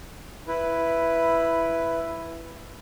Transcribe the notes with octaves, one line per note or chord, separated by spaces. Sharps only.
E4 B4